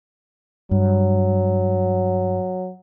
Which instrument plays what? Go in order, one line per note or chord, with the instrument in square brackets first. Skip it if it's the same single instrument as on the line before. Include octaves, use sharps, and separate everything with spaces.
[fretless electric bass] G2 [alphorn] F#3